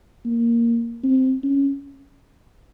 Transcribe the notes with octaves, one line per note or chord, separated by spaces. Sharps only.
A#3
C4
C#4